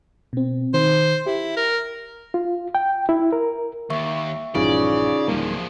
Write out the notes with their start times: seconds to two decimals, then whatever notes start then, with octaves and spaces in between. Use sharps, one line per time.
0.33 B2 C4
0.74 D#3 C5
1.26 E4 G4
1.57 A#4
2.34 F4
2.75 G5
3.09 E4
3.32 A#4
3.90 D#2 E5 C#6
4.55 A#1 G2 C#3 E3 D#4 F4 D5 F5
5.28 D1 F3 G3 G#3 A#3